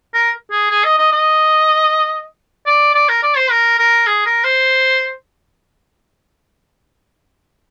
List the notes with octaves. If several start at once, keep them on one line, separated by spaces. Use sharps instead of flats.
A#4
G#4
G#4
D#5
D#5
D#5
D5
D5
A#4
D5
C5
A#4
A#4
G#4
A#4
C5